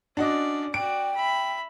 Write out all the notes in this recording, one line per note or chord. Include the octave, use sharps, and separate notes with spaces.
C#4 D4 F#4 D5 D#5
F#4 D5 G5 D7
E5 B5